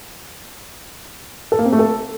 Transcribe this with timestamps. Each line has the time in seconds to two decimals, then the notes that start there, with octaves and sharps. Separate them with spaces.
1.52 A4
1.59 A#3
1.66 C4
1.72 A3
1.79 A4